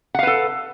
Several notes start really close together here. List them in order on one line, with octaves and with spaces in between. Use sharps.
F#5 F5 B4 A4